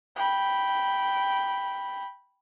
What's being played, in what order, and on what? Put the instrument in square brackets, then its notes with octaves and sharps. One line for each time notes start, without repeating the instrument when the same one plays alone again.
[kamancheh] G5 B5